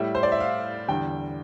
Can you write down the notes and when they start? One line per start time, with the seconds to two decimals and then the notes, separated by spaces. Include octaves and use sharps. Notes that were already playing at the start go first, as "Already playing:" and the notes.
Already playing: A2 G3 E5
0.15 C5
0.23 D5
0.32 E5
0.40 F5
0.88 E2 D3 G3 G5